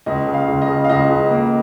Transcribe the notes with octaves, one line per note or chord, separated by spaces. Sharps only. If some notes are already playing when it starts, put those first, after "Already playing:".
C#2 D#5
C#3
F5
C#2
D#5
C#3
F5
C#2 D#5
C#2
A#3